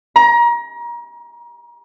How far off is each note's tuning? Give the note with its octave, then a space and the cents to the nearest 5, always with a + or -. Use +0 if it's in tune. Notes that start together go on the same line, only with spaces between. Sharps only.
A#5 +30